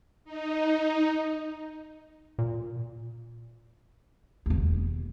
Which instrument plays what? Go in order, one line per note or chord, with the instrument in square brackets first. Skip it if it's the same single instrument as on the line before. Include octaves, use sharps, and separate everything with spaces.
[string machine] D#4
[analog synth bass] A#2
[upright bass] E1 D#2